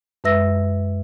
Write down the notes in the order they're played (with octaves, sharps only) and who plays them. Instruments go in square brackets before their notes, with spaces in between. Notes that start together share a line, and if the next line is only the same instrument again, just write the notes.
[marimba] F#2 G#3 B4 E5 E6 A#6